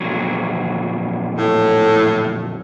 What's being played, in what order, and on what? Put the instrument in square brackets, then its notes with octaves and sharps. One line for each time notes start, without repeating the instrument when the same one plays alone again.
[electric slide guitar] F2 A#2 F#3
[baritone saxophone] A2